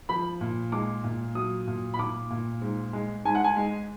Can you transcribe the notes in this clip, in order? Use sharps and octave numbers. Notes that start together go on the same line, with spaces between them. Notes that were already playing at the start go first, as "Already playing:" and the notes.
F3 B5
A#2
G#3 D6
A#2
F#3 D#6
A#2
B5
A#2 D6
A#2
G#2
G#3
G#2 G#5
F#5
G#5
G#3